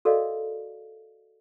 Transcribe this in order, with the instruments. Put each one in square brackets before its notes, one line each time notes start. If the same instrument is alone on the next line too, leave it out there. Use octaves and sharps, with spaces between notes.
[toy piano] F#4 A4 A#4 D5 D#5 F5